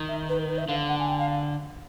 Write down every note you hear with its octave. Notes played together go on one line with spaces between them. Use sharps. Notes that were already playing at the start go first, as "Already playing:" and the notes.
Already playing: D#3
E5
B4
A#4
B4
E5
D3 F5
F#5
G#5
G5
F5